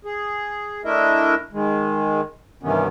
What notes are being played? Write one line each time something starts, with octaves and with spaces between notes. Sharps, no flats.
G#4
A3 D4 E4 A#4 D#5 E5
D#3 G#3
G2 C3 D#3 E3 B3 C#4